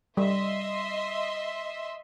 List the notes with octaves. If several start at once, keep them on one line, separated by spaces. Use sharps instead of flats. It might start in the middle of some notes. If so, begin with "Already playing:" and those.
G3 D#5 E5 C6